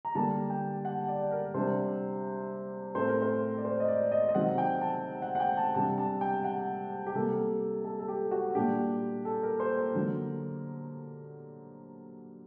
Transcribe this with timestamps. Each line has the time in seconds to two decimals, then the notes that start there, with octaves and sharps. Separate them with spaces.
0.05 A#5
0.15 D3 G3 A#3 D4 A5
0.50 G5
0.85 F#5
1.08 D5
1.31 A#4
1.54 C3 G3 D4 C5
2.95 A2 A3 C4 C5
3.08 A#4
3.22 C5
3.57 D5
3.65 C5
3.80 D#5
3.88 D5
4.11 D#5
4.29 D#5
4.35 C3 D#3 F#3 C4 F#5
4.58 G5
4.81 A5
5.22 F#5
5.35 F#5
5.40 G5
5.57 A5
5.75 C3 G3 D4 A5
5.98 A5
6.21 G5
6.44 F#5
7.06 G4
7.15 C3 G3 A#3 A4
7.84 A4
7.99 A4
8.08 G4
8.31 F#4
8.55 A#2 G3 D4 G4
9.25 A4
9.43 A#4
9.60 C5
9.77 A#4
9.95 D3 F#3 A#3